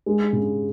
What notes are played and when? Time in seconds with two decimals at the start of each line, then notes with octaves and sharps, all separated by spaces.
0.06 G#3
0.33 C#3